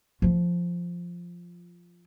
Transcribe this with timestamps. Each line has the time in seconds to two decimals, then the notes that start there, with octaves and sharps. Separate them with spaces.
0.22 F3 F4